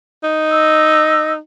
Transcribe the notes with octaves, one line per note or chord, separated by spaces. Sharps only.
D#4
D#5 E6